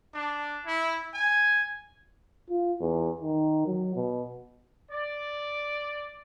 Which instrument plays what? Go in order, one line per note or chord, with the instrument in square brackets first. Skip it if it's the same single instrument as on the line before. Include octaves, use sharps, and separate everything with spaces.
[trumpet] D4
E4
G#5
[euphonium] F4
E2
D#3
F#3
B2
[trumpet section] D5